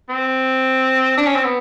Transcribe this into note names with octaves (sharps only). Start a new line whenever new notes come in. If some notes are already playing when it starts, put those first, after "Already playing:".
C4
D4
C#4
C4
B3